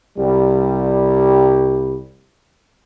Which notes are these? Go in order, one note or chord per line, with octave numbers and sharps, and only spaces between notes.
C2 G3